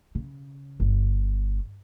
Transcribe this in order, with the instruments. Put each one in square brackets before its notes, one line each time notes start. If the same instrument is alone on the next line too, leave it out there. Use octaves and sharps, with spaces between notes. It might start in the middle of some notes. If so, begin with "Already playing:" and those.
[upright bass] C#3
G1